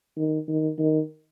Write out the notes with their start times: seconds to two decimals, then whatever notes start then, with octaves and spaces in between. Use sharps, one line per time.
0.17 D#3
0.48 D#3
0.79 D#3